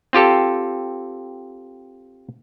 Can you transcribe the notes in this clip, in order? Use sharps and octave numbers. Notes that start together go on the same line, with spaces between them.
C4 F4 G4 A4